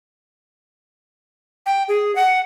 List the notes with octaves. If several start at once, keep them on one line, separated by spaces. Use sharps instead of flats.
G5
G#4
F#5